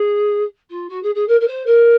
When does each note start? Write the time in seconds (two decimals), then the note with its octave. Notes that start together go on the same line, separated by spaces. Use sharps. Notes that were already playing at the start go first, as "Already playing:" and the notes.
Already playing: G#4
0.70 F4
0.89 F#4
1.02 G#4
1.14 G#4
1.28 A#4
1.40 A#4
1.47 C5
1.66 A#4